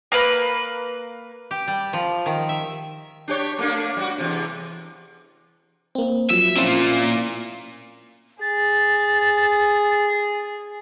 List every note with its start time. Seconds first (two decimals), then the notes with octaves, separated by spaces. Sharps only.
0.12 A#3 B4
1.51 G4
1.67 G3
1.93 F3
2.26 D#3
2.49 E5
3.28 D4 G4 C#5
3.58 A3 A#3 D4
3.97 G3 F#4
4.18 E2 C3
5.95 A#3 C4
6.30 F3 F#3 E5
6.56 A#3 C4 C#4 E4 F4
8.41 G#4 A6